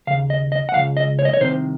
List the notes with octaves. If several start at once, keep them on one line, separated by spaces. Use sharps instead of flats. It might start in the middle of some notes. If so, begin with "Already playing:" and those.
D#2 C#3 F5
D#5
D#5
F#5
C#2 C#3 F5
D#5
C#5
D#5
C#5
C2 C3 D#3 C5